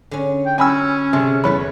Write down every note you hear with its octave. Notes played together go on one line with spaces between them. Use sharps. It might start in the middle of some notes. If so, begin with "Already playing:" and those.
D3 C#4
G5
C#4 F#4 G#5 B5 E6
C3 D4 G#4 A4
E2 A3 A4 B4 C#5 B5